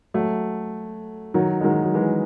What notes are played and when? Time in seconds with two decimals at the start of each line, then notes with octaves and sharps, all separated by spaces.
0.14 F#3 A3
1.34 D#3 F#3
1.61 G#3
1.64 D#3 F#3
1.84 F#3
1.94 E3 G#3